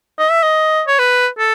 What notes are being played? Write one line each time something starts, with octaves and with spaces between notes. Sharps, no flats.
D#5
E5
D#5
C#5
B4
A4